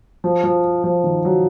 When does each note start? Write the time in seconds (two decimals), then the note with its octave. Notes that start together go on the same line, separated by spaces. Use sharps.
0.24 F3
0.44 F3
0.84 F3
1.04 D#3
1.25 F#3